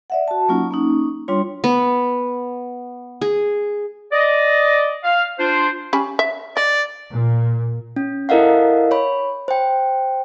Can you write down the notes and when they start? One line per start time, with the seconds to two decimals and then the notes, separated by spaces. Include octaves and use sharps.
0.10 D5 E5 F#5
0.28 F#4 A5
0.49 F#3 A#3 C#4 D#4 F4
0.71 A#3 C#4 D#4
1.28 G3 D4 F4 C#5 C6
1.64 B3
3.21 G#4
4.12 D5 D#5
5.03 F5
5.39 D4 F4 C5
5.93 C#4 G4 B5
6.19 E5
6.57 D5 D#5
7.12 A#2
7.96 C#4
8.29 E4 A4 A#4 D#5 F5 F#5
8.91 C#5 B5
9.48 C5 G5